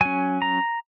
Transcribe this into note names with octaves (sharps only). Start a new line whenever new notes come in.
F#3 C#4 G#5
A#5